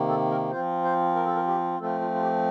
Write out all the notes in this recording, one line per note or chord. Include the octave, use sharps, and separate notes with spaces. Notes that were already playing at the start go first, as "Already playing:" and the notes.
Already playing: C3 D#3 A#3
A4
A#4
F3 C4 F4 C5
C5
A#4
A4
A#4
G4
F3 A3 C4 F4 A4
F4
F4
G4